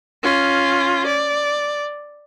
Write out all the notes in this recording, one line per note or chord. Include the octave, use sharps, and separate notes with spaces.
C#4 F4
D5